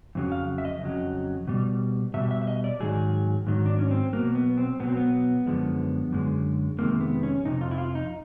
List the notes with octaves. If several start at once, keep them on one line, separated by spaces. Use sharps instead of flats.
F2 C#3 F#3
F5
E5
D#5
F2 C#3 F#3
B2 G3
B2 G3 E5
E5
E5
D#5
D5
G#2 D#3 F#3 G#4
G#2 D#3 F#3
D4
C#4
C4
B2 F#3 A#3
B3
C4
B2 F#3 B3
C4
B3
F#2 D3 F3 G#3
F#2 D3 G#3
F2 C3 D#3 G#3 A#3
B3
C#4
F2 C3 D#4
F4
E4
F4
D#4